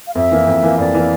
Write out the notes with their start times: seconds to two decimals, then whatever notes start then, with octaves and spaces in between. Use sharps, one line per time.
0.07 F5
0.15 F2 E5
0.31 E3 A#3
0.47 F2
0.63 E3 A#3
0.79 F2 D5
0.94 E3 A#3